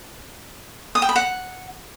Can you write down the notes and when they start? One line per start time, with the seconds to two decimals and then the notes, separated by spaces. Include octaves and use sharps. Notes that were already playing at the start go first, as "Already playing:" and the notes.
0.95 D#6
1.02 G5
1.09 B5
1.16 F#5